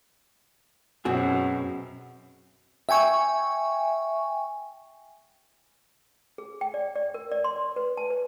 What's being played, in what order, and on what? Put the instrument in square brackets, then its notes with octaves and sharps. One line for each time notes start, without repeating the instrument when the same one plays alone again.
[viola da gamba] F#2 B2 [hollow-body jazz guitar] C4 F#4 G#4
[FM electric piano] E5 G5 G#5 C#6
[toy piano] G#4
G5
D5
D5
A#4
D5
C6
D5
B4
A5
B4